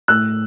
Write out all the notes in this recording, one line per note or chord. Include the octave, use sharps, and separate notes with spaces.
A2 E6 F#6